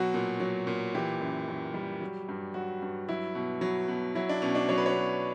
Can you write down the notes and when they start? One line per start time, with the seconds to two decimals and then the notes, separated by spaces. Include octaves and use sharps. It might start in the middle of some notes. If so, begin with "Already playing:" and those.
Already playing: B2 F#3 F#4
0.14 A#2
0.40 F#3
0.67 A#2
0.95 E3 G4
1.20 F#2
1.48 F#2
1.74 G3
2.01 F#3
2.29 G2
2.54 F#3 F#4
2.82 G2
3.08 F#3 E4
3.35 B2
3.61 F#3
3.88 B2
4.15 F#3 E4
4.29 D4
4.42 B2 C#4
4.55 D4
4.69 F#3 C#5
4.78 B4
4.86 C#5
4.95 B2